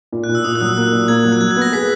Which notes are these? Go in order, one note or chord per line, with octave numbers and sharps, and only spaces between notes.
A#2
F#6
A#2
E6
A#2 D#6
F#6
F#3 E6
A#3 F#6
A#2
A#3 G#6
F#3
F#6
F#3 G#6
G#6
B3
A#6
G#4 B6